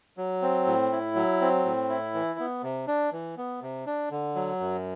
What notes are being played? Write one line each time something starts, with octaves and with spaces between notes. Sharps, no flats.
F#3
C4
A2
E4
F#3
C4
A2
E4
E3
B3
C3
D4
E3
B3
C3
D4
D3
F#3
F#2